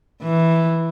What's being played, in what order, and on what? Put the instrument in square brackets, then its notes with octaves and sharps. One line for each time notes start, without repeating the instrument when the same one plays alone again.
[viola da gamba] E3